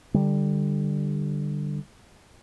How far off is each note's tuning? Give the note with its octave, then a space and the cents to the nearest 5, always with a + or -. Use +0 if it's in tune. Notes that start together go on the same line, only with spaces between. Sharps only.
D3 +10 G3 +0